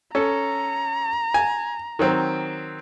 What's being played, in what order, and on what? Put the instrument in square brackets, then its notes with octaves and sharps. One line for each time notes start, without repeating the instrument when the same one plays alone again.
[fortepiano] C#4 A4 [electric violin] A#5
[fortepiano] G#5
D#3 F#3 C4